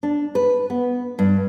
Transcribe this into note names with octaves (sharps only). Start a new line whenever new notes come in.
D4
B4
B3
G2